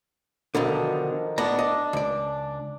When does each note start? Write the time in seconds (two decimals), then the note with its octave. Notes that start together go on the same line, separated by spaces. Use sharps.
0.55 B1 B2 D3 D#3 F3
1.38 A2 B3 D4 A#5
1.59 D#5
1.93 C#2 D5